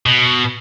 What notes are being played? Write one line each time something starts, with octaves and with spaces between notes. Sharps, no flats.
B2